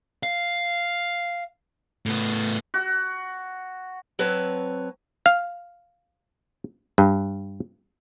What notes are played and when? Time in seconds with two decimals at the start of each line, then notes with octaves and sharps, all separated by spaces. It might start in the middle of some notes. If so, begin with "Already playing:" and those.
0.23 F5
2.06 A2 B3
2.74 F#4
4.19 F#3 C4 B4 C#5 A5
5.26 F5
6.98 G2